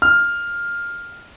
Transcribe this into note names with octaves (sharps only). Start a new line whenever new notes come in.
F6